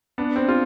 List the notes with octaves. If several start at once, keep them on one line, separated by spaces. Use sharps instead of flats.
B3 D4
C4
F4